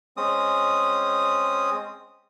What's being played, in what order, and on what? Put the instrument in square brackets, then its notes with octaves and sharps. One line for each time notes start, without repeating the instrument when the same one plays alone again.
[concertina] G#3 C4 C#4 D#6